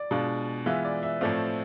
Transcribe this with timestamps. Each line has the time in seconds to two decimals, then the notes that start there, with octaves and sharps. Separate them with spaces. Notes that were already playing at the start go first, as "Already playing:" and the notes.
Already playing: D5
0.11 B2 G#3 D4 F4
0.66 E3 G#3 B3 F4 E5
0.85 D5
1.03 E5
1.21 A2 F3 A3 C4 D5 F5